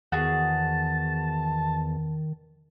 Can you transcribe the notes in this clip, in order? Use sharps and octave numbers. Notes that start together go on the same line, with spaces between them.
E2 D#3 F#4 G#4 A5